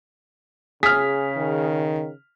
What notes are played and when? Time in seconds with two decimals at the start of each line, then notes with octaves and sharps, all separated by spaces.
0.83 C#3 G#4 F6 B6
1.36 D#3